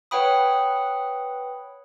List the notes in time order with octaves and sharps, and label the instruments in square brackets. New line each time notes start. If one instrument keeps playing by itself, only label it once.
[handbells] B4 C#5 F#5 G5 B5 D#6